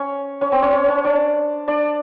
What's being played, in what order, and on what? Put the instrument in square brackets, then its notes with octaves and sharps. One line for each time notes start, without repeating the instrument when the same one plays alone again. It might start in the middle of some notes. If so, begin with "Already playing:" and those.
Already playing: [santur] C#4 C#5
C#4 C#5
C4 C5
C#4 C#5
C#4 C#5
C#4 C#5
D4 D5
D4 D5